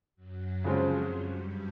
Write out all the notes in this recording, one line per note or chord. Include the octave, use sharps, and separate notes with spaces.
F#2 F#3
C#3 F3 G#3 C4 F4
G2 G3